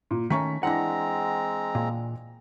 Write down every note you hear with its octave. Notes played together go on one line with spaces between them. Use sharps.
A#2
D#3 A3 C#4 A#5 C#6 B6
E3 G#3 C4 D4 F#5 A#5 A#6
A#2